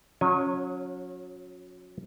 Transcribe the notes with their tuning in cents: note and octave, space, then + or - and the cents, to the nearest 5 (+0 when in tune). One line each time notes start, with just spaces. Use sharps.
F#3 -35 C#4 +0 G#5 -25